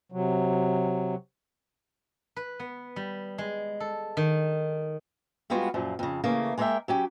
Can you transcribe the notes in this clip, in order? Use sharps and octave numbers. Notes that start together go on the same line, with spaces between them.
C3 F#3
B4
B3
G3
G#3
A4
D#3
G3 G#3 B3 F4 F#4
F#2 A#2 F3
F2 C#3
C#3 E3 A3 A#3
G#3 A#3 A#4 C5 E5 G5
F#3 C#4 G4